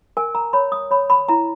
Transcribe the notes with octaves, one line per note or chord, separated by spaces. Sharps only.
A#4 G#5
A#5
C#5 B5
D#6
C#5 B5
B5
E4 A#5